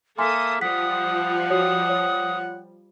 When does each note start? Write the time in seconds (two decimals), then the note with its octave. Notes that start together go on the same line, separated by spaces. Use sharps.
0.19 A#3 A4 E5 G#5 C6 D#6
0.61 F3 G3 F#5 D#6 B6
1.50 F#4 C#5 D#6
1.89 C#5